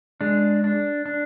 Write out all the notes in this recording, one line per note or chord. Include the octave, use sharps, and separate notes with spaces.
G#3 D4
D4
D4